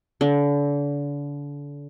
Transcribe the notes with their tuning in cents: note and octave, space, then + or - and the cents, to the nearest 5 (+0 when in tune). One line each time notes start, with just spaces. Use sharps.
D3 -35